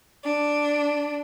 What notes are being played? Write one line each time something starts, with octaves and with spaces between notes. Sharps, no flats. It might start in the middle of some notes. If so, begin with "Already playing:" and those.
D4